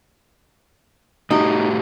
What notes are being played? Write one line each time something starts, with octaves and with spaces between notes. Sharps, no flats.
A2 D#4 F#4 G4